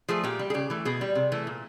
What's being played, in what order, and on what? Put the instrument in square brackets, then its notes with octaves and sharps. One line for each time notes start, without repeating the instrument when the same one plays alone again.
[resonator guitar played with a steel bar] F3 A3 G#4
A#2 G4
G3
G#4
C#3 G4
E3 A3
B2 G#4
G3
C3
E3 A3
A#2